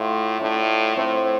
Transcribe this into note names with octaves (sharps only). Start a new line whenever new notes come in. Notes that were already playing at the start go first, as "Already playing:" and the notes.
Already playing: A2 F4
A2 D4
A2 C4